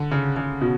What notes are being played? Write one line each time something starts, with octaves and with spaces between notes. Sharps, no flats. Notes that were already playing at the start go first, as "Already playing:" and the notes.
Already playing: D3
C#3
C#3
B2